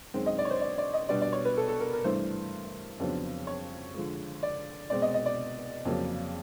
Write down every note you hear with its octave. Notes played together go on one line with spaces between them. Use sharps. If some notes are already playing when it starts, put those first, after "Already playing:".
F#2 D#3 G#3 C4
D#5
D5
C#5
C5
D5
D5
D#5
B2 G3 B3 D4 D5
D5
C#5
B4
A4
A4
A#4
A#4
G2 E3 A3 D4 C5
F2 C#3 F#3 B3 D4
C#5
D3 F3 G#3
D5
B2 G#3 C4 D5
D#5
D#5
D5
F2 C#3 F#3 A#3